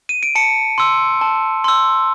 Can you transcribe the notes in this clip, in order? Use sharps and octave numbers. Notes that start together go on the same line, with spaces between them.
D#7
D7
A5 C#7
C6 E6
A5
C6 E6